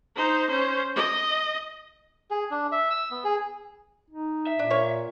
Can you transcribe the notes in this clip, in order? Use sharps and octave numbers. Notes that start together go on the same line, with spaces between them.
D#4 C5
C#4 C5
D#5
G#4
D4
E5
E6
B3
G#4
D#4
E5
A#2 D4
A#3 C#5